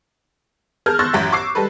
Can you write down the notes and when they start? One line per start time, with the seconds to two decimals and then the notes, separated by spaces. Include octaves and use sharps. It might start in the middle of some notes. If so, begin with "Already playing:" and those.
0.86 G#4 A#4 A5 F6 G6
0.99 C6 C#6 E6 F#6 A6 A#6
1.13 A1 F#2 G4 E5
1.32 C#6 D6 E6 C7
1.55 G3 G#3 A4 B4